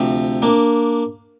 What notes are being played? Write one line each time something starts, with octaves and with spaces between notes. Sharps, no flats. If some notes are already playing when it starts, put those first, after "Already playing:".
Already playing: D2 C3 F3
A#3 D4